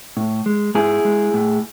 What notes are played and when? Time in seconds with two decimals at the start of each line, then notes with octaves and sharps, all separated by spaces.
0.17 A2
0.46 G#3
0.75 G#2 E4 G#4
1.05 G#3
1.34 A2